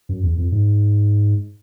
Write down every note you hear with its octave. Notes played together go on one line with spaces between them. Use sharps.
F#2
E2
F2
G#2